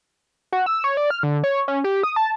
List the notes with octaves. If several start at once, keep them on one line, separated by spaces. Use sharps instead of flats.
F#4
E6
C#5
D5
F6
D3
C#5
C#4
G4
D#6
A5